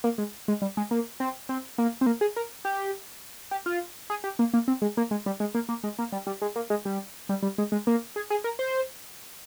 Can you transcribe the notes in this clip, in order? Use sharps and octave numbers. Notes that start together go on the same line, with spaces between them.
A#3
G#3
G#3
G3
G#3
A#3
C4
C4
A#3
C4
A#3
G#4
A#4
G4
G4
F4
G#4
G4
A#3
A#3
C4
G#3
A#3
G#3
G3
G#3
A#3
A#3
G#3
A#3
G3
G3
G#3
A#3
G#3
G3
G3
G3
G#3
G#3
A#3
G#4
G#4
A#4
C5